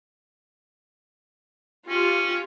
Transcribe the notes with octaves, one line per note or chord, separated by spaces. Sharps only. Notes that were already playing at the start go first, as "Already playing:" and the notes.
C#4 F4 G4